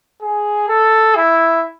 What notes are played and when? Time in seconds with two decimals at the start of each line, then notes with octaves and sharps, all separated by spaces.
0.22 G#4
0.69 A4
1.15 E4